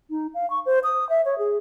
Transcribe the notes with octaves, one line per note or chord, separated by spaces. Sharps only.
D#4
F5
C#6
C5
D#6
E5
C#5
G#4